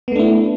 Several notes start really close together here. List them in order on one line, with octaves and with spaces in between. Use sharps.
B3 A3 D4 E4